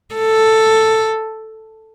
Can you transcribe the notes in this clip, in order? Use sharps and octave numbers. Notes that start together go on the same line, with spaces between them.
A4